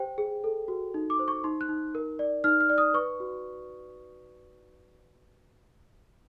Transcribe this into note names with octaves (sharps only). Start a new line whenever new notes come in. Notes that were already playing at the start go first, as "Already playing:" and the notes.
Already playing: G4 C5 G5
G#4
A4
F#4
D#4
D6
C5
C#6
D#4 C6
F#6
D#4
A#4
D5
D#4 F6
F6
D5
D#6
B4 C#6
F#4